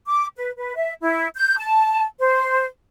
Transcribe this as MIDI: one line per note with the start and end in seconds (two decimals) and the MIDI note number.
0.07 0.27 86
0.36 0.51 71
0.57 0.75 71
0.75 0.91 76
1.00 1.27 64
1.35 1.55 91
1.56 2.02 81
2.19 2.64 72